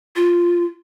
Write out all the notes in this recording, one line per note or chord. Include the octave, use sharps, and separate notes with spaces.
F4